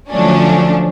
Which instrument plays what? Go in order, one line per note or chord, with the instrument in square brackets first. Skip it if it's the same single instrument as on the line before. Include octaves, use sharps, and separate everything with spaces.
[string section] D3 F3 F#3 A3 C#4 D4